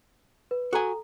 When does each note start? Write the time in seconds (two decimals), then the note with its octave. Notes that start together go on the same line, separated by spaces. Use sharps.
0.51 B4
0.73 F#4 A4 G#5 A#5